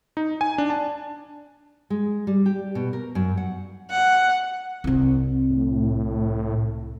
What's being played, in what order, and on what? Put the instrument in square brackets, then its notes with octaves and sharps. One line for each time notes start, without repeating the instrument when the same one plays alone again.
[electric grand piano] D#4
G#5
D4
A5
[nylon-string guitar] G#3
G3
G4
B2
A#4
F#2
F#5
[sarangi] F#5
[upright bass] C2 C4
[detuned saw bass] A2